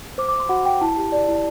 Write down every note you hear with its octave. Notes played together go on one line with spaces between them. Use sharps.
C5 D6
D6
C5
C6
F#4 F#5
F#4 G5
E4 A5
G4
D5
E4